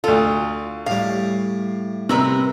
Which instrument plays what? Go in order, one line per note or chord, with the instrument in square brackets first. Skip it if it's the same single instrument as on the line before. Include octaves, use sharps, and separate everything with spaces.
[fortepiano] D2 A4 [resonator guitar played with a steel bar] F4
[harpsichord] A2 G3 [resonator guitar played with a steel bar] F5
[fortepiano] C3 E6 [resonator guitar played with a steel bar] C4 A#4 B4